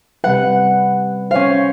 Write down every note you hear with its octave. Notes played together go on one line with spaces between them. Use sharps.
C3 G3 B4 F#5
C#4 C5 C#5 F5